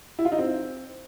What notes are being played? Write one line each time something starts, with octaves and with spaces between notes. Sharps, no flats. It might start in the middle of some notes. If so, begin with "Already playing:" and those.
E4
F4
D#4
C4